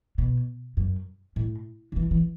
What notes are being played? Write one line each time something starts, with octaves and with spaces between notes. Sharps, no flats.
B2
F#2
A2
D3
E3
E3